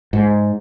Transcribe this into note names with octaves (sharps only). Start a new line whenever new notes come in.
G#2